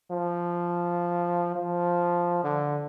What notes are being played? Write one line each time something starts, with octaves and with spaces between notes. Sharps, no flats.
F3
F3
D3